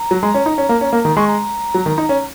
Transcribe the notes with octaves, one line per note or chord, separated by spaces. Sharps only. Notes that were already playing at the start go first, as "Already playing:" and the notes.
Already playing: A#5
F#3
G#3
C#4
D#4
C#4
A#3
C#4
A#3
D#3
G#3 C#6
A#5
F#3
D#3
D#4
C#4